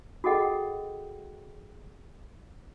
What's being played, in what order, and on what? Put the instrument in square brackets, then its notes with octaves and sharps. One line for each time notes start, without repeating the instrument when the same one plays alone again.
[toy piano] F#4 G#4 A4 D#5 F#5 G5